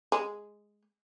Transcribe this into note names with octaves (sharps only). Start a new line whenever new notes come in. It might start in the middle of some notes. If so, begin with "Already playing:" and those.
G#3